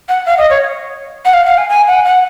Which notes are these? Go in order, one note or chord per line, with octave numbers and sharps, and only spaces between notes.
F#5
F5
D#5
C#5
F#5
F5
F5
G#5
G#5
F#5
F#5